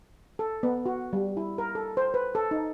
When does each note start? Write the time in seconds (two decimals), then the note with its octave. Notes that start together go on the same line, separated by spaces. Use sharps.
0.39 A4
0.63 B3
0.86 F#4
1.13 G3
1.37 E4
1.58 A#4
1.75 A4
1.97 C5
2.14 B4
2.35 A4
2.51 D#4